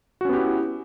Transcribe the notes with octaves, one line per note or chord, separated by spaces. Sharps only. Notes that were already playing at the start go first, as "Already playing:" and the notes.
B3 C#4 E4 F#4 G4